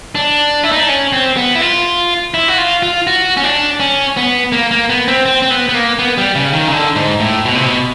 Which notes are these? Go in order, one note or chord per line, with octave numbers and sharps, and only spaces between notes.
D4
E4
D#4
D4
C#4
C4
B3
E4
F4
E4
F#4
F4
F4
F#4
C#4
D4
C#4
B3
A#3
A#3
B3
C4
C4
C4
B3
B3
A#3
B3
G3
C#3
D#3
C#3
D3
G#2
A2
B2
C3
B2